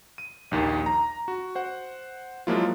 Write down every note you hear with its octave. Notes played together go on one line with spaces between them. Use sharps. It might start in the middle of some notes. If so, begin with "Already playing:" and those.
D#7
A#1 D#2 D#3
A#5
F#4
C5 F#5
F3 F#3 G#3 A#3 E4 F4